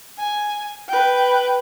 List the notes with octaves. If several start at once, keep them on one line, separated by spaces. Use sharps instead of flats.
G#5
B4 G5